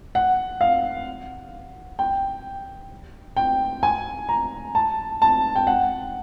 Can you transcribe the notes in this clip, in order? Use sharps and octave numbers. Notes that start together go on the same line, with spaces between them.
F#5
F5
G5
G5
G#5
A#5
A5
A5
G5
F#5